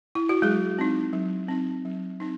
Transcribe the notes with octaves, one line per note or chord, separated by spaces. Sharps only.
E4
F#4
F#3 G#3 G#4
C4 D#4
F#3
C4 D#4
F#3
C4 D#4